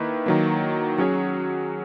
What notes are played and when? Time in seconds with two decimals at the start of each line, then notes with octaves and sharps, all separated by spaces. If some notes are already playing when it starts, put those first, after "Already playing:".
Already playing: D#3 A#3 E4 B4
0.26 D#3 F#3 A#3
0.98 F#3 C#4 G#4 C#5